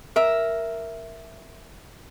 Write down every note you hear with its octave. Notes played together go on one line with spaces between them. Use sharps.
A#4 E5